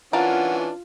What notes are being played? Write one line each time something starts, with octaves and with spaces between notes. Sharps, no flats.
E3 C#4 D4 F4 A#4 F5 F#5 A5